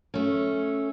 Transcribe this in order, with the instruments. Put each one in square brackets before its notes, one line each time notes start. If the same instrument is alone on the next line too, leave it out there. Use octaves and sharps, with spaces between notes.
[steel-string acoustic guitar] A3 C#4